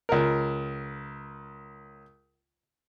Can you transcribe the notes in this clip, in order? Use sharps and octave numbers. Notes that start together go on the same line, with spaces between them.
C#2 A#4